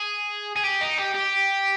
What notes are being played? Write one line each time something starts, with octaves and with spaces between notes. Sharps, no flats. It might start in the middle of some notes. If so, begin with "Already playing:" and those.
Already playing: G#4
G#4
G4
D#4
G4
G4